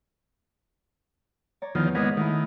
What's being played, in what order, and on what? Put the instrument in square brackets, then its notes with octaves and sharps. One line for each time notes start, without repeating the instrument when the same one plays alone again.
[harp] C#5 D5 A#5
[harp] E2 [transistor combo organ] D#3 F3
[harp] G#2 D#5 F#5 [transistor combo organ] G#3 A#3 B3
[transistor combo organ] D#3 [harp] A3 E4